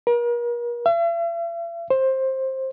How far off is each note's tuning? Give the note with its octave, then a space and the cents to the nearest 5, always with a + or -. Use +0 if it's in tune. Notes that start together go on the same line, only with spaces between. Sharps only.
A#4 +40
E5 +45
C5 +15